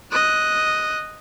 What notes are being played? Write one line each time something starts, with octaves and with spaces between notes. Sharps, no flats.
D#5 F#6